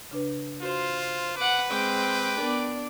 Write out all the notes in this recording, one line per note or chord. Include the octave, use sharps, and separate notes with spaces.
C#3 D4 B4
F4 F#4 C5
B4 F#5 D6
G#3 C4 G5 D6
B3 D4 A#4 D5